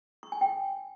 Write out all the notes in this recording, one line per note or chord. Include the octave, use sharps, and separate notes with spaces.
C#6
G#5
G5